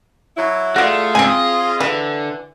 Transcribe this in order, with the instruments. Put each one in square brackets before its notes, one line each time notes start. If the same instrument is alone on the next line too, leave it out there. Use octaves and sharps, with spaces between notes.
[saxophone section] F#3 E4
[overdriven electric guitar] A3 [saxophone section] F4 G#4 [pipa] F#4 D5
[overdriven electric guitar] G#2 C#3 [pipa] C4 G#5
[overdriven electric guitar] D#5
[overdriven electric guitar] D3 [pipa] E3